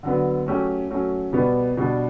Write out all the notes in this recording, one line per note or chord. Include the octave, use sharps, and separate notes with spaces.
D3 F#3 B3
F#3 A3 C#4 G4
F#3 A3 C#4
B2 G3 B3
B2 G3 D4